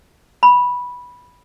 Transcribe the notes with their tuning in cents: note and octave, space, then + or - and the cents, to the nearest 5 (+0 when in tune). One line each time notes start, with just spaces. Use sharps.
B5 -10